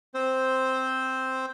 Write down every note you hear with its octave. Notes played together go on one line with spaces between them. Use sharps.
C4 C5